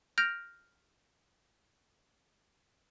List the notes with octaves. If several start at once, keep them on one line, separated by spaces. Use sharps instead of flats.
F6 G6 A#6 D7 F7